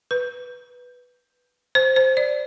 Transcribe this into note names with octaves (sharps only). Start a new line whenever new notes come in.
B4
C5
C5
D5